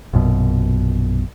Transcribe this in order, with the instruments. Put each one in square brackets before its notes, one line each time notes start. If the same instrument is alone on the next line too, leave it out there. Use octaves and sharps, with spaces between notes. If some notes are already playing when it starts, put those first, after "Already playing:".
[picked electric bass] A#1 F#2 B2